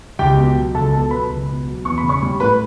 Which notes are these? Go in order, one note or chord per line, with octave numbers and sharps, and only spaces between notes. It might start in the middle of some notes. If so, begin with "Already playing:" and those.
C#2 G4 G5
B2
F#3
C#2 A4 A5
B2 A4 A5
F#3 B4 B5
C#2
B2
F#3
E2 C#6
B5
C#3
C#5 C#6
G3
A2 B4 B5